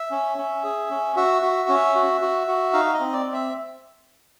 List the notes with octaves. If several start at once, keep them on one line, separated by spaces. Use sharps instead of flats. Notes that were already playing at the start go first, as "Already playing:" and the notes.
Already playing: E5
C#4
C#4
G#4
C#4
F#4 E5
F#4
C#4
F#4
F#4
F#4
D#4 F5
D#5
C4
D5
C4
E5